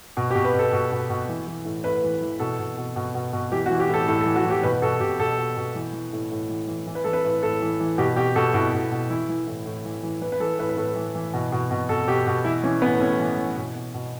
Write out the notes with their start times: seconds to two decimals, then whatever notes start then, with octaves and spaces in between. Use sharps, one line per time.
0.17 B2
0.31 G4
0.35 B2
0.45 B4
0.54 B2
0.59 A4
0.73 B2
0.92 B2
1.10 B2
1.29 E3
1.47 E3
1.65 A2
1.84 A2 B4
2.04 E3
2.22 E3
2.40 B2 A4
2.59 B2
2.78 B2
2.96 B2
3.15 B2
3.33 B2
3.52 E3 G4
3.66 F#4
3.70 E3
3.80 G4
3.89 A2 A4
4.08 A2 A4
4.21 A4
4.26 E3
4.36 F#4
4.45 E3
4.50 G4
4.63 B2 B4
4.82 B2 A4
5.00 B2 G4
5.19 B2 A4
5.38 B2
5.57 B2
5.75 E3
5.93 E3
6.13 A2
6.31 A2
6.49 E3
6.68 E3
6.87 E3
6.95 B4
7.04 E3 A4
7.13 B4
7.24 A2
7.43 A2 A4
7.62 E3
7.80 E3
7.98 B2 G4
8.16 B2 G4
8.36 B2 A4
8.54 B2 E4
8.73 B2
8.91 B2
9.10 E3 E4
9.29 E3
9.47 A2
9.66 A2
9.85 E3
10.03 E3
10.21 E3 B4
10.32 B4
10.40 E3 A4
10.59 A2 B4
10.69 B4
10.77 A2 A4
10.96 E3
11.15 E3
11.34 B2
11.52 B2
11.71 B2
11.89 B2 A4
12.08 B2 G4
12.27 B2
12.45 E3 E4
12.63 E3 C#4
12.82 A2 B3
13.00 A2 C#4
13.19 E3
13.38 E3
13.57 B2
13.75 B2
13.94 B2